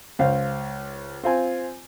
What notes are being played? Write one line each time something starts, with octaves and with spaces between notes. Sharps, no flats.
C#2 C5 F5
C4 F4 G#5